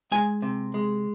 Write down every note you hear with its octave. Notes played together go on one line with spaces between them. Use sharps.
G#3 G#5
C3
G#3